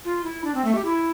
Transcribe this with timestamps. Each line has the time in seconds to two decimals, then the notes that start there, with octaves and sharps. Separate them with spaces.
0.05 F4
0.24 E4
0.44 D4
0.55 C4
0.65 A3
0.75 G4
0.85 E4